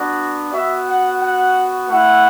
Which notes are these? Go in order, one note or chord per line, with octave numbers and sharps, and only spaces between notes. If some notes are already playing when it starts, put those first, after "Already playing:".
Already playing: B3 D4 F#4
B3 F#4 E5
F#5
F#5
A3 E4 F#5